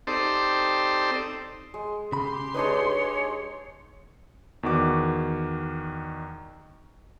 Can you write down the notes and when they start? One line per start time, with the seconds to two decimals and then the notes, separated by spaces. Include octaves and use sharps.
0.07 C4 D#4 G4 A4 C5 D5
1.74 G#3
2.12 C#3 G4 B5 C6
2.55 G#3 D4 D#4 B4 C#5
4.63 E2 D#3 F#4 D6